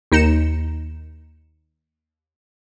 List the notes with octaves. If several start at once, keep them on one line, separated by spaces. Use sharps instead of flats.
D#2 D#4 C#7 E7